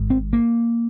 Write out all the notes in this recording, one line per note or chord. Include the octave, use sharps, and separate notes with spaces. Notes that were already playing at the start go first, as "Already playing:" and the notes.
Already playing: G#1 G#2
C4
A#3